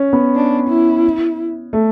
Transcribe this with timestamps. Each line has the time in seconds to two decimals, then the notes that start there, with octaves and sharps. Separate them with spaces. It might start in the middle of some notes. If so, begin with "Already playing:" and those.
Already playing: C#4
0.13 B3
0.35 D4
0.69 E4
1.73 A3